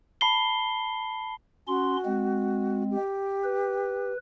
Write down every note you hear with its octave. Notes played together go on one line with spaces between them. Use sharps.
A5 B5 C7 G7
C#4 F#4 C6
G#3 C4
G4
B4